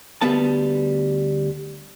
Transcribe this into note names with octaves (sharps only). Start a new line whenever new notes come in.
D2 G3 B3 B4 A5